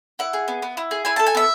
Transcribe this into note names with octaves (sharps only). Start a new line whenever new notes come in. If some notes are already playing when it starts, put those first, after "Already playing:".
E4 F#5
G#4
B3
B3
E4
G#4
E4 G#5
A4 A5
G#5
B3 E5